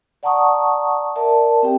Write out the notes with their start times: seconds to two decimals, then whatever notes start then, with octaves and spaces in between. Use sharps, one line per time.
0.23 D5 F#5 A5 A#5 C#6 D#6
1.16 A#4 D5 E5 A5
1.63 C4 G4 G5